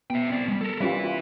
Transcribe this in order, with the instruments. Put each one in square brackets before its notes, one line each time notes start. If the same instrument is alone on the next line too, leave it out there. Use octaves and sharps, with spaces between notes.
[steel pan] B3 [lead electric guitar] E5 G5
[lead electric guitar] C4 D5
G3 G#3
A4 A#4
[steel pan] G3 C#4 F4 [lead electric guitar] E4 B4
[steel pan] F4